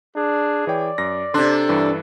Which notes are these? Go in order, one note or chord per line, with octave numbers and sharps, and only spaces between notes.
D4 G#4
E3 C#5 D5 G5
F#2 A#6
C3 D4 A4 C6 F#6
G2 E3 G3